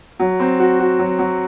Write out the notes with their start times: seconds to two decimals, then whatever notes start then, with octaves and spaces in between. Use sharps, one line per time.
0.19 F#3
0.40 C4
0.60 F#4
0.80 F#4
0.99 F#3
1.19 F#3